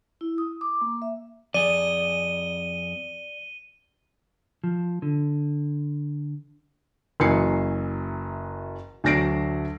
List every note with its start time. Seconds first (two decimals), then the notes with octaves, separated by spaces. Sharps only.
0.21 E4
0.38 D#6
0.61 D6
0.81 A#3
1.02 E5
1.54 F2 G#4 D5 D#7 G7
4.64 F3
5.02 D3
7.20 F#1 E3 F#3 G#5 C7 C#7
9.04 D2 F#3 D4 A#6 C7 D7